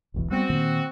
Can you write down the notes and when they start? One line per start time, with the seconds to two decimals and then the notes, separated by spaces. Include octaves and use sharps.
0.14 E1 B1 E3
0.31 G3 B3 C4 F#4
0.50 A#2 D#3 A#3